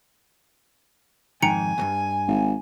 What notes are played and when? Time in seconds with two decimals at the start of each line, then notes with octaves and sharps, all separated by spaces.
1.43 F2 G#2 D#3 G5 G#5 A#5 C#7
1.78 D2 G2
2.27 G#1